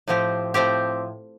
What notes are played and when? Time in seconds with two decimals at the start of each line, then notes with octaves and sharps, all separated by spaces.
0.08 A2 F3 C4 G4
0.54 A2 F3 C4 G4